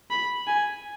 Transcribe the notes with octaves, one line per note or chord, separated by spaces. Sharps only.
B5
G#5